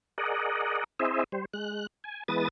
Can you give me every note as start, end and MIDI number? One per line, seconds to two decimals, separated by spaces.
0.18 0.84 68
0.18 0.84 70
0.18 0.84 74
0.18 0.84 75
0.18 0.84 78
0.99 1.24 60
0.99 1.24 64
0.99 1.24 68
0.99 1.24 72
0.99 1.24 75
0.99 1.24 76
1.32 1.45 55
1.32 1.45 72
1.54 1.87 56
1.54 1.87 90
2.04 2.23 80
2.28 2.48 52
2.28 2.48 56
2.28 2.48 59
2.28 2.48 71
2.28 2.48 87
2.28 2.48 93